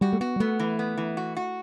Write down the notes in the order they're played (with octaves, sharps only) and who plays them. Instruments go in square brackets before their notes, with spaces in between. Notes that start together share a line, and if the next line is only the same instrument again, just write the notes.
[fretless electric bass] G3 [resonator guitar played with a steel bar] F#4
[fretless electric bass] A3
[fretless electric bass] B3 [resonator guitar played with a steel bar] F#4
[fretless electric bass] G3
[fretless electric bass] A3 [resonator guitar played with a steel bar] B3
[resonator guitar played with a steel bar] E3
B3
E3
F#4
F#4